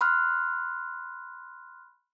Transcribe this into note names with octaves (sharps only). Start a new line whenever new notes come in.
B5 C6 F6 F#6